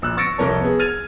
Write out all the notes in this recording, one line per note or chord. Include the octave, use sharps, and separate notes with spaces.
A#1 E6 F#6
C#6 E6 A6 A#6 C#7 D7
C2 F2 C3 A#4 C#5 A5
B3 G#4
F6 G#6 A6 D#7 F7